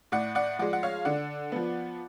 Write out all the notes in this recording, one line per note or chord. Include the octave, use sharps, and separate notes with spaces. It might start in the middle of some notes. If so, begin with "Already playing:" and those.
A2 D5 F#5
D5 F#5
F3 G#3 D5 F#5
F#5
C#5 F5
D3 D5 F#5
F3 B3